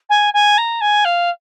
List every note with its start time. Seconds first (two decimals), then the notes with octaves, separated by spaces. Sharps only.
0.09 G#5
0.33 G#5
0.57 A#5
0.81 G#5
1.04 F5